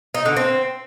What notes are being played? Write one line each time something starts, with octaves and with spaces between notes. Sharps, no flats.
D#4
D3
C4